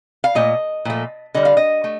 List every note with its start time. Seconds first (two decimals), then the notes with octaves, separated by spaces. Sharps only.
0.24 F5
0.35 A#2 A3 D#5
0.85 A#2 F3 A3
1.34 D3 G3 D#5
1.45 F5
1.57 D#5
1.84 A3